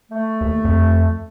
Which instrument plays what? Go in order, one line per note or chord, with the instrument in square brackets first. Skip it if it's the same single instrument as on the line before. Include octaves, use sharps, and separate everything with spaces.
[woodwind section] A3
[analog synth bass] D#2
F2